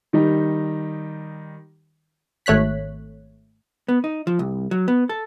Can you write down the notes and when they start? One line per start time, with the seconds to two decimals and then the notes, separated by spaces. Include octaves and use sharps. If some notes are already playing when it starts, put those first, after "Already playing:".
0.13 D#3 G3 D#4
2.46 G#1 A3 C#5 F#6 B6
3.88 B3
4.04 D#4
4.27 F3
4.39 C2
4.71 F#3
4.88 B3
5.09 A4